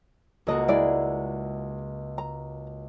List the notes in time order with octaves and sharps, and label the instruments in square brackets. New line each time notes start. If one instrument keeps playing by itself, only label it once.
[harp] C#2 A#3 F#4 [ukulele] A4 D#5
[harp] G#3 [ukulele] E4 G#4 D5
[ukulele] A#5